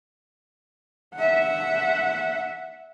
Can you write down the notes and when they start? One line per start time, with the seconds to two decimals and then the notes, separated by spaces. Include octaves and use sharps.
1.15 E5 F#5